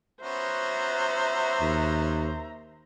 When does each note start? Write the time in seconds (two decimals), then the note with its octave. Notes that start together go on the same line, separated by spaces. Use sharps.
0.23 B3 C#4 F#4 C5 E5 A#5
1.61 D#2